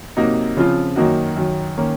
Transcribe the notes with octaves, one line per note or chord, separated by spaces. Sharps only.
C3 F#3 A#3 D#4 F#4
C#3 F3 C4 F4
F#2 D#3 A#3 D#4 F#4
F#2 D#3 F#3
D#3 A#3 C#4